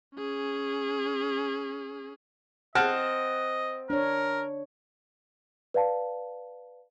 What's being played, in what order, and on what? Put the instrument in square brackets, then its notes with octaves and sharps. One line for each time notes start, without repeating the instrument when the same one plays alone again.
[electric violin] C#4 G#4
[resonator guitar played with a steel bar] C4 [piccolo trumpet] D#5 [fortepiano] F#5 A5 F6
[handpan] D4 C#5 [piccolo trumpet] A#4
[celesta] B4 D5 F5 A5